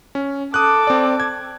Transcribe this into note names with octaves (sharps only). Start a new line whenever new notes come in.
C#4
A4 D6 D#6 F#6
C4 D5
G#6